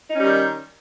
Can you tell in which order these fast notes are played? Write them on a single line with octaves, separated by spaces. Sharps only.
D#4 C#4 G3 D#3